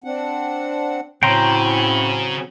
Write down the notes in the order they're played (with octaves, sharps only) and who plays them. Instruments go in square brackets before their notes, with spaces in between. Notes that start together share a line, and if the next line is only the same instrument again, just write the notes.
[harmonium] C4 D4 F#5
[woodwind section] A2 [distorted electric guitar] C#3 [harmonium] F#3 C4 [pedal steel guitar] G5 A#5 C6